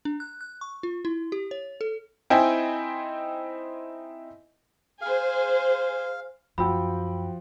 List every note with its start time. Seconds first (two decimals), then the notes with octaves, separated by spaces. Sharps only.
0.05 D4
0.20 F#6
0.41 F#6
0.61 C#6
0.83 F4
1.05 E4
1.32 G4
1.51 C#5
1.81 A4
2.30 C4 D#4 E4 D#5 G5 G#5
5.02 G#4 C5 F5
6.58 F#2 F3 F#4 G5 B5 E6